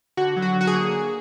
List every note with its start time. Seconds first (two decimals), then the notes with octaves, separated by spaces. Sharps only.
0.17 D3 F#4
0.37 F#3
0.42 F#4
0.55 D3
0.61 F#4
0.67 G#4
0.74 A#3